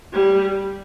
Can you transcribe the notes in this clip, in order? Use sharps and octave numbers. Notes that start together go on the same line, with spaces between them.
G3